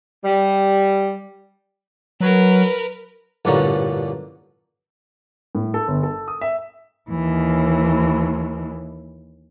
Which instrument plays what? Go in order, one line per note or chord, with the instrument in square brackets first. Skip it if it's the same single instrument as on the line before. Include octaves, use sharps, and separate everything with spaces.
[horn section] G3
[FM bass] F#3 [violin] A#4 B4
[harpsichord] A1 G2 A#2 D3 C#4 A#5
[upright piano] A2
A4
G1
A4
D#6
E5
[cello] D#2 E3